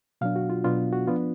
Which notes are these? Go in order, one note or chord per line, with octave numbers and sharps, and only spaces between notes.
B2 F#3 B3 D4 F5
F#4
F4
B2 F#3 B3 D4 F4
F#4
F3 B3 D4 F4